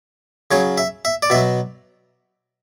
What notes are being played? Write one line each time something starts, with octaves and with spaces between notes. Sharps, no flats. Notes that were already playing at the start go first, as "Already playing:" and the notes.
C#3 F#3 C#5
E5
E5
D5
B2 F#3 E5